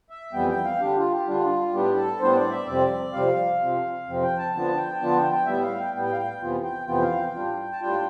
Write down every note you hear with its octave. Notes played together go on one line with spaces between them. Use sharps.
E5
F2 E3 G3 B3 G5
G5
F5
D3 G3 D4 G4
F4
G4
D3 G3 D4 F4
A2 G3 B3 D4 G4
A4
A2 G3 B3 D4 C5
D5
E5
F2 C3 G3 C4 D5
F2 C3 G3 C4 F5
F2 C3 F3 C4
F2 C3 F3 C4
G5
A5
D3 F3 B3 D4 F4 A5
G5
D3 F3 B3 D4 F4 A5
G5
G5
A2 G3 B3 E5
F5
G5
A2 G3 B3 G5
F5
G5
F2 C3 E3 B3 F4
G5
F2 C3 E3 B3 F4 G5
F5
G5
A2 G3 D4 F4
A5
A2 G3 D4 F4 G5